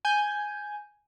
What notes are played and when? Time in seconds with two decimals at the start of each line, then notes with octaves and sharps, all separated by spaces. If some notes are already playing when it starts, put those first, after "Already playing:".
0.05 G#5 G6